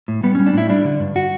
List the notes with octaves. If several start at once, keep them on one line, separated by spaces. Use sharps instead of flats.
A2
G3 B3
G3 C#4
D4
A2 E4
G3 D4
D3
G2
F#4